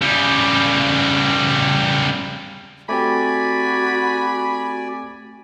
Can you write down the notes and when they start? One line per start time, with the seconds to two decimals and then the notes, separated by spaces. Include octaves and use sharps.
0.02 C#3 G3
2.89 A3 C4 F#4 G4 D5 G#5 B5